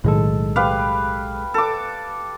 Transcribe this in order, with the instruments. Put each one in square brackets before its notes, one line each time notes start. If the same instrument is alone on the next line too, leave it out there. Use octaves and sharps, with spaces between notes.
[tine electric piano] B1 G#3 A4 [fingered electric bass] A2 D#3
[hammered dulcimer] G4 B4 F5
A4 D6